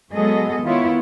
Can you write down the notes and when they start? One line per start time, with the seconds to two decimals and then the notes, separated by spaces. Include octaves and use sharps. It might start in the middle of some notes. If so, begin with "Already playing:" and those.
0.13 F#3 G#3 B3 G#4 A4 D#5
0.63 D#3 B3 E4 F4 B4 C#5